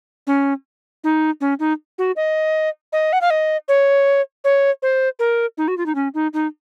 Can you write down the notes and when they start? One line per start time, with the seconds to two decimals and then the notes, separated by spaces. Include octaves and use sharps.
0.27 C#4
1.04 D#4
1.41 C#4
1.59 D#4
1.98 F#4
2.16 D#5
2.93 D#5
3.13 F#5
3.21 F5
3.30 D#5
3.68 C#5
4.44 C#5
4.82 C5
5.19 A#4
5.57 D#4
5.68 F#4
5.77 F4
5.86 D#4
5.95 C#4
6.14 D#4
6.33 D#4